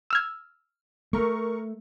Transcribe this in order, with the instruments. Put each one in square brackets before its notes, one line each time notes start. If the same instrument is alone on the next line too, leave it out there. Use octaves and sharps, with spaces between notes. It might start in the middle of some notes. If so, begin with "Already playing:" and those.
[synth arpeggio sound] E6 F6 G#6
[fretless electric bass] A3 [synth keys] A#4 C#6